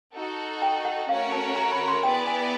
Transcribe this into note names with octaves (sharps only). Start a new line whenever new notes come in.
D#4 F#4 A4
G5
F#5
A3 C#4 F#4 A#4 C#5 F5
A5
A#5
B5
C6
B3 E4 G#4 B4 D5 G5
G#5